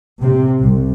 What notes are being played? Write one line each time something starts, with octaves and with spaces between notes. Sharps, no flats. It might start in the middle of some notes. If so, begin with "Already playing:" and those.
C3
C2